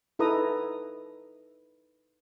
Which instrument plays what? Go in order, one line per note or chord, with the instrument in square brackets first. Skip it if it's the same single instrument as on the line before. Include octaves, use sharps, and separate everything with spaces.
[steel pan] D#4 E4 A4 B4 A#5 D#6